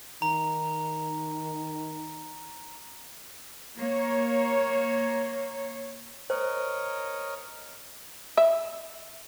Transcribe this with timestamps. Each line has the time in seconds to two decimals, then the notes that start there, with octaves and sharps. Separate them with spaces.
0.22 D#3 A#5
3.78 A#3 C#5
6.30 A#4 C5 C#5 D#5
8.37 E5